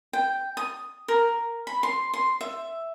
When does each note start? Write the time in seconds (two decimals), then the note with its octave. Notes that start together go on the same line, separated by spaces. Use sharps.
0.13 G5
0.57 D#6
1.08 A#4
1.67 B5
1.83 C6
2.14 C6
2.41 E5